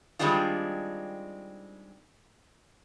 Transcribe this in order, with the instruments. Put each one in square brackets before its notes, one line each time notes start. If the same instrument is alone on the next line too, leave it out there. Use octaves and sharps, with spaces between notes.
[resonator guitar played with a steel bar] D#3 G3 G#3 C4 D4 F4